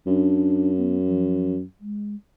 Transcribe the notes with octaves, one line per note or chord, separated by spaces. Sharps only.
F#2 D4
B3
F3
G#3